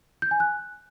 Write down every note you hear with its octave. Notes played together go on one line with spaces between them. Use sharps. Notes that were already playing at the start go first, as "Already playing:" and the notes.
G6
G#5
F#6